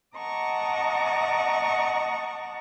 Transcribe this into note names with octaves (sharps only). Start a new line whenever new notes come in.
D#5 F#5 A5 A#5 C#6 D6